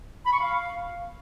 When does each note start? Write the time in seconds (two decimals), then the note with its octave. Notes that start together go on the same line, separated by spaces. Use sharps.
0.25 B5
0.33 C#6
0.40 F5